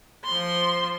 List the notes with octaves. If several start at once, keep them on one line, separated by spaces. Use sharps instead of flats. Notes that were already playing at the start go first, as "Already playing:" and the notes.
F3 C6